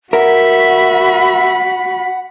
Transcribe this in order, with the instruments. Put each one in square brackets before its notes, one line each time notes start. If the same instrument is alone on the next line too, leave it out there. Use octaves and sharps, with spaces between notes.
[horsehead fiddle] F#4 B5 [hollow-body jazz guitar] A#4 [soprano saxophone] E5 [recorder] F#5